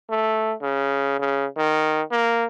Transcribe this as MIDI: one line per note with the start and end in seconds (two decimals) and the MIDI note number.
0.10 0.54 57
0.62 1.17 49
1.19 1.46 49
1.57 2.02 51
2.11 2.45 58